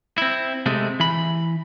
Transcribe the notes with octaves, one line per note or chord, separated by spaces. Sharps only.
C4 E4
C3 G#3 A3
E3 B5